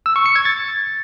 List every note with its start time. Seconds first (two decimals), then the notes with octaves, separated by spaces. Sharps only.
0.06 E6
0.16 C#6
0.26 C#7
0.36 G#6
0.45 A6